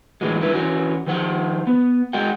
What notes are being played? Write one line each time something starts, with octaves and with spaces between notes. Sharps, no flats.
A2 E3 F#3 G#3
G2 E4 B4
E3 C#4 F#4
D#3 F3 C5 F#5
B3
G#3 F#4 G#4 D#5 F#5 G5